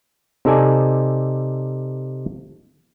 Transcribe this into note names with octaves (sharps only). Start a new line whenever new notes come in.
C3 D#4 A4 D5 G#5